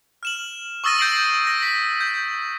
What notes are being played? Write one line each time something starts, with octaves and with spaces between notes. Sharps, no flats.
F6 E7 F#7
C#6 D#6 E6 A6 A#6 D#7
G6 C7 D7 F#7
A#6
B6
G6